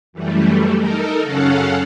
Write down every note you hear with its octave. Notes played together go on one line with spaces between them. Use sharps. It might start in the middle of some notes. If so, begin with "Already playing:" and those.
F#2 E3 G3 A3
D#4 A4 A#4
F#2 C#3 C#4 A4 F5 F#5